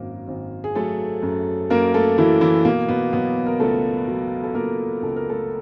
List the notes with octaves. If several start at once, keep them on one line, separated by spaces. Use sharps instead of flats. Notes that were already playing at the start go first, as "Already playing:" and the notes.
Already playing: G#1 F#2 A#3 A#4
G#1
G#4
F#3 A3 A4
F#2
F#2 A#3 A#4
A3 A4
E3 F#3 E4
E3 E4
B2 A#3
B2 B3
B2 F#3 B3
A#4
C#2 A3 A4
F#3
A4
C#2 A#3 A#4
C#2 A4
A#4
A3 A4